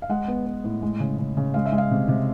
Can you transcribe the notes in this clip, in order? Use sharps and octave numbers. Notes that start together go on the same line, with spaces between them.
F5
G#3 F#5
B3
B3
A2
G#3
C#3
C#3
C#3
G#3 F5
E5
G#3
F5
C3
C3